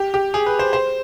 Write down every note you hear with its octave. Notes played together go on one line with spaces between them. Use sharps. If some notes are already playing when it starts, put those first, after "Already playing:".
Already playing: G4
G4
G#4
B4
C5
C5